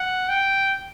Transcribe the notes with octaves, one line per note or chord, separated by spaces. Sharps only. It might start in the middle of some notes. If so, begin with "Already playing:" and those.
Already playing: F#5
G5